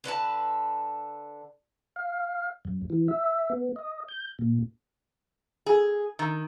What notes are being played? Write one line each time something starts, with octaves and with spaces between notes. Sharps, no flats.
D3 B4 C#5 A5
F5
F#2
E3
E5
B3
D#5
G6
A#2
G#4
D#3